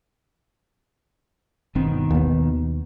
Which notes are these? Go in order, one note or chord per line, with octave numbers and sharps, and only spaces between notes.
G1 B2 D#3 C4
D#2 B3